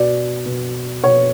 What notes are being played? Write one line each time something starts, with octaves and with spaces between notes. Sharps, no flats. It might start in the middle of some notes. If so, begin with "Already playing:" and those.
Already playing: B2 D5
B2
B2 C#5